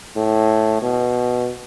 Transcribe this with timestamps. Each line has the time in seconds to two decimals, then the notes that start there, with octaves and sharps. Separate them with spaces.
0.16 A2
0.82 B2